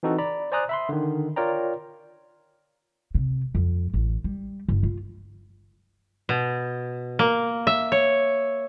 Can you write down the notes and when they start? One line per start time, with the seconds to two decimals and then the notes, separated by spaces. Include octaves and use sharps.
0.03 E3 C4 D#4 F#4 A4
0.19 D5 A#5 B5
0.52 C5 D5 G#5 A#5 D#6 F#6
0.69 E5 B5 C6
0.89 D3 D#3
1.36 F4 A#4 C#5 D5 G5 A#5
3.15 C3
3.55 F2
3.94 A1
4.24 G3
4.69 G1
4.83 F4
6.29 B2
7.19 A#3
7.67 E5
7.92 C#5